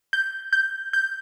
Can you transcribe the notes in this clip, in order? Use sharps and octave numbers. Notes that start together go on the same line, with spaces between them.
G6
G6
G6